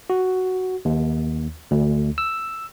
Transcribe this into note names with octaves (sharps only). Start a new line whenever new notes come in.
F#4
D#2
D2
E6